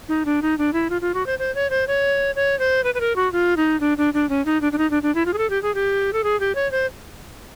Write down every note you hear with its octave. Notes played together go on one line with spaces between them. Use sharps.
D#4
D4
D#4
D4
E4
F4
F4
F#4
C5
C5
C#5
C5
C#5
C#5
C5
B4
B4
A#4
F#4
F4
D#4
D4
D4
D4
C#4
D#4
D4
D4
D#4
D4
D4
E4
F4
G#4
A4
G4
G#4
G4
A4
G#4
G4
C#5
C5